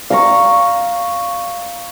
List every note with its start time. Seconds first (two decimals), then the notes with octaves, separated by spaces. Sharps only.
0.10 F5 A#5 C#6